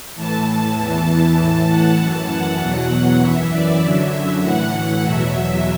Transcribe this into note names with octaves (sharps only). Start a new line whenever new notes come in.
A2 E3 A5
E2 E3 A5
A2 E3
F#5
F#2 E3 A5
F#5
E2 B2 F#3 F#5
F#5
F#2 E3 E5
D5
F#2 D3 F#3 E5
A2 E3 F#5
E2 B2 F#3 E5